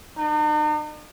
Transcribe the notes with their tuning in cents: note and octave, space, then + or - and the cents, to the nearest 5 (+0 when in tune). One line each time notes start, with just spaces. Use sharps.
D#4 -45